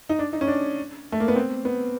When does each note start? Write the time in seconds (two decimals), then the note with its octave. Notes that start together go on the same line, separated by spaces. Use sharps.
0.09 D#4
0.19 D4
0.33 D#4
0.41 C#4
0.47 D4
1.12 A3
1.20 A#3
1.28 B3
1.36 C4
1.65 B3